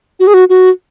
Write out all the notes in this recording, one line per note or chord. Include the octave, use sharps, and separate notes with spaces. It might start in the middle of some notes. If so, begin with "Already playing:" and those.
F#4
G#4
F#4
F#4